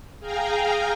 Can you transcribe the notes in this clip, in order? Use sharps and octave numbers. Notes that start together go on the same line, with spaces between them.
G#4 F5 G5 G#5 A#5